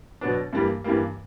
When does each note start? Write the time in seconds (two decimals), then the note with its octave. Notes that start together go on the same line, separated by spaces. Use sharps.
0.21 B2 F#3 B3 D4
0.53 G2 E3 G3 A#3
0.84 G2 E3 G3 A#3